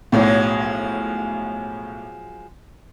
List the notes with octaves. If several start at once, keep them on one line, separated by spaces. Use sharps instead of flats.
B1 A2 F3 F#3 G#3